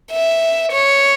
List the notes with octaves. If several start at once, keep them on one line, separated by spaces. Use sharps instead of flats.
E5
C#5